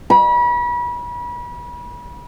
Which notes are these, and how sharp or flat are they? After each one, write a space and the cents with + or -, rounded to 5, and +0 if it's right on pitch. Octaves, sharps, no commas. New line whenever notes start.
B5 -35